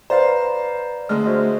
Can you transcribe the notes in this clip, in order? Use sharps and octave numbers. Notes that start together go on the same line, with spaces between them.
B4 C5 D5 F5 A#5
D3 G#3 A3 F6
F#4 C5 D#5